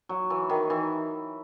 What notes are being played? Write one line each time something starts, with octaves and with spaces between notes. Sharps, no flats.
F#3
E3
D#3
E3